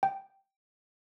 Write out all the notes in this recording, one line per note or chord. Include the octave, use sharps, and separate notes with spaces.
G5